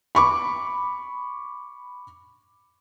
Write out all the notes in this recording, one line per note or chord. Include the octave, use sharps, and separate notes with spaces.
B5 C#6 D6